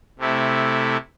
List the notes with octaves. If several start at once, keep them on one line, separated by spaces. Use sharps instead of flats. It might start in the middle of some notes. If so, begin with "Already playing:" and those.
C3 A3 E4